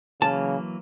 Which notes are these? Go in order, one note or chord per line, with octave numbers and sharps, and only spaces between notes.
C#3 E3 F#3 A#3 A5